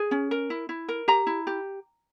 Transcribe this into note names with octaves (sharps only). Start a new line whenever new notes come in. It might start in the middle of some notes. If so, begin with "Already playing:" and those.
Already playing: G#4
C#4
A#4
E4
E4
A#4
G4 A#5
E4
G4